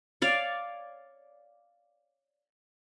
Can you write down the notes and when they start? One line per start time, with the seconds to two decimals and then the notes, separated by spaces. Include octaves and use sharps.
0.22 C#5 D5 F5